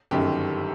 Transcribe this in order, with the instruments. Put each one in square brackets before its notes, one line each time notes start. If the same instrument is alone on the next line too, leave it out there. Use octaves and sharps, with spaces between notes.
[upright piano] G1 F#2 D#3 G4